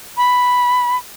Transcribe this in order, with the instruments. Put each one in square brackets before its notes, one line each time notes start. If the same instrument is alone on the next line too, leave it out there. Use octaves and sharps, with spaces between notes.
[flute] B5